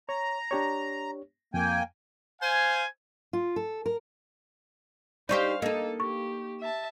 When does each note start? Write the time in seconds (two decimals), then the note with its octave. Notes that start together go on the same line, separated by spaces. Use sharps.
0.09 C#5 A#5
0.51 D4 G4 C#5
1.54 F2 A#3 G5 G#5
2.41 C5 F5 G#5
3.33 F4
3.56 A4
3.86 A#4
5.29 D#4 F4 G4 C5 D5 F5 C#6
5.62 A#3 D#4 A4 D#5
6.00 G4 C#6
6.60 E5 A5